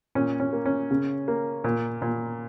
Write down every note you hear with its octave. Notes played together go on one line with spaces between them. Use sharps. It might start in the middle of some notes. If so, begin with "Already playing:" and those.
A#2 C#4
C#4
A#3
C#4
C#3
A#3
A#2
A#2